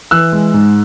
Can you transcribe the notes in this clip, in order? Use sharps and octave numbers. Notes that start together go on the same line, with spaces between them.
E3 E6 F#6
G#3
G#2